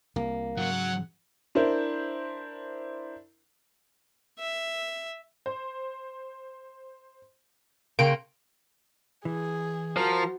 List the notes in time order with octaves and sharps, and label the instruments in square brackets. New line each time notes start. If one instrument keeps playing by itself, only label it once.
[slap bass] C2 [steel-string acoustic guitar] A#3
[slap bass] G#2 C#3 [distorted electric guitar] F#3 [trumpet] F#5
[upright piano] D4 E4 A#4 C5
[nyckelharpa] E5
[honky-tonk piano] C5
[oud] C#3 [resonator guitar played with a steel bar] A#3 [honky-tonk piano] G5 C6 C#7 [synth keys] D7
[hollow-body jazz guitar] E3 [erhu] G#4
[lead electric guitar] F3 [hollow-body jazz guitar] F#4 C5 [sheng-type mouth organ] A#4 A5 F6